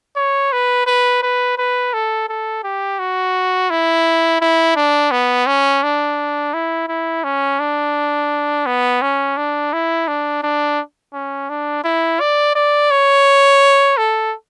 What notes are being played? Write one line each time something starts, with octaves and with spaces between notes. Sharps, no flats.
C#5
B4
B4
B4
B4
A4
A4
G4
F#4
E4
E4
D4
B3
C#4
D4
E4
E4
C#4
D4
B3
C#4
D4
E4
D4
D4
C#4
D4
E4
D5
D5
C#5
A4